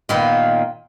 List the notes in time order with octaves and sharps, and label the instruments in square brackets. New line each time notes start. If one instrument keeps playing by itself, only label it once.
[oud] A#2 D#3 B3